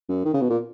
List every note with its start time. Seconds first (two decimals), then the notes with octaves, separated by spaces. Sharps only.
0.09 F#2
0.25 D#3
0.34 C#3
0.41 B2
0.50 A#2